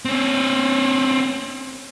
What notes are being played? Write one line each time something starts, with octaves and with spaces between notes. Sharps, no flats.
C4 C#4